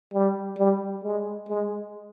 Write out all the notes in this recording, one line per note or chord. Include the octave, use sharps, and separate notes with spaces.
G3
G3
G#3
G#3